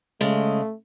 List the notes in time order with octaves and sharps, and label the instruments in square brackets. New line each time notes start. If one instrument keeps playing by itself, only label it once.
[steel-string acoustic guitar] C#3 G#3 [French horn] A3